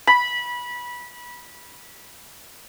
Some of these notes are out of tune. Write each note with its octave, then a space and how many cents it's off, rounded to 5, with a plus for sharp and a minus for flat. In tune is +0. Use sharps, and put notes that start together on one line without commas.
B5 -20